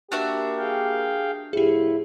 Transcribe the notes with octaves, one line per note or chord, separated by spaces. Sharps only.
A#3 D4 F#4 G4 A#4 E5 F#6
G#4 F5 G5
A2 D3 F3 E4 G4 G#4